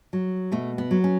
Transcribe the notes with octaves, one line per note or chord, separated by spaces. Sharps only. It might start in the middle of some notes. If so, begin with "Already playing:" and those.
F#3
B2 A3
B3
F#3
C#4